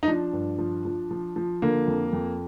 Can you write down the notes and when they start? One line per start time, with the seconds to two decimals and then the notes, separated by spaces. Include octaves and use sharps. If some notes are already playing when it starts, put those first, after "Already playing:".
0.03 D#4
0.08 F3 D4
0.33 G2
0.59 F3
0.85 F3
1.11 F3
1.36 F3
1.62 D3 A#3
1.87 F2
2.13 F2